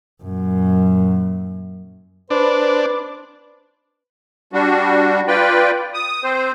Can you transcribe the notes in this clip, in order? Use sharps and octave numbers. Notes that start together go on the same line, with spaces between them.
F#2 A#2
D4 B4 C5
G3 D4 F#4
F4 B4 D5 G5
D#6
C4 C5